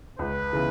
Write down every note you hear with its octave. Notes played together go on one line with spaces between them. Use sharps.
C#2 B4
C#3 E3 B3 E4